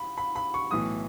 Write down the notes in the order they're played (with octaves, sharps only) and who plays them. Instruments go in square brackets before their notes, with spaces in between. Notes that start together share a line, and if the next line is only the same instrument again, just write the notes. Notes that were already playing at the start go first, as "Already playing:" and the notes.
Already playing: [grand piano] B5
B5
B5
C#6
B1 A2 E3 D#6